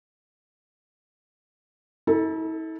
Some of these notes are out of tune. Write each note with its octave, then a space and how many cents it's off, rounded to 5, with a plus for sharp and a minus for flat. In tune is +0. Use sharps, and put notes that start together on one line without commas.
E4 -45 A4 +0